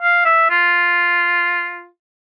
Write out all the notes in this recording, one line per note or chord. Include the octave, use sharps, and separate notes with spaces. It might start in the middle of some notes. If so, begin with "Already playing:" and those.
F5
E5
F4